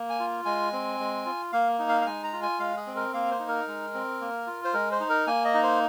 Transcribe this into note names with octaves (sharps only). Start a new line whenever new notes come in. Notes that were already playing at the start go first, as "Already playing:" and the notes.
Already playing: A#3
G#5
F4
G#3 G#5
C4
G#3
F4
A#3 F5
D#4
F5
F5
G#3 G#5
A#5
F4
G#5
G#3 F5
G#4
C4
A#4
A#3 F5
C5
D#4
A#4
G#3
C4
A#3
F4
C5
G#3 A#4
C5
D#4
A#4
A#3 G#5
D#5
D#4
C5